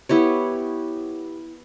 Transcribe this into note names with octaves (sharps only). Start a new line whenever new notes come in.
B3 E4 G4 C#5